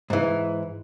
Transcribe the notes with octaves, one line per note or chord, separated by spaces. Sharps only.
G#2 E3